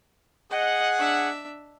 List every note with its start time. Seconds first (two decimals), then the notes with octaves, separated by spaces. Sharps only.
0.51 G#4 D#5 F#5
0.98 D4 E5